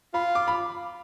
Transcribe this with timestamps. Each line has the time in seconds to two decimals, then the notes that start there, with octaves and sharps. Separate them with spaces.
0.14 F4 B5
0.35 D6
0.48 B5